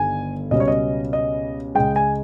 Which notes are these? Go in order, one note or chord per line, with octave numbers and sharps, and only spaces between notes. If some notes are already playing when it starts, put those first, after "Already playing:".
Already playing: G1 G2 D#3 G#5
C#2 B2 G3 C#4 D#5
C#5
D#5
D#5
C#2 C#3 G#3 G5
G#5